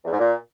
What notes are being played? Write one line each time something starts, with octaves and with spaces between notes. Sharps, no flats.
E2
G#2
A#2